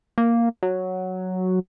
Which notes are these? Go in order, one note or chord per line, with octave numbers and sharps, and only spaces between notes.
A#3
F#3